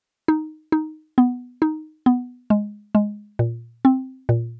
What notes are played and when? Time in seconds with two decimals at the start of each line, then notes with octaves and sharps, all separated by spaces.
0.28 D#4
0.72 D#4
1.18 B3
1.62 D#4
2.06 B3
2.50 G#3
2.95 G#3
3.39 A#2
3.85 C4
4.29 A#2